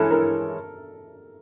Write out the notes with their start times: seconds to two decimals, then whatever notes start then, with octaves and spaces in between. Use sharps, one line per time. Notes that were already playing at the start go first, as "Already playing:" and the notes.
Already playing: E3 G#3 C#4 E4 A4
0.11 A#4